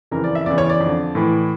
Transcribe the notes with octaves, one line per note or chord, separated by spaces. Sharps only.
F2 C#3 E3 A#4
D5
E5
E2 C#3 E3 D5
C#5
D5
F2 D3
A2 E3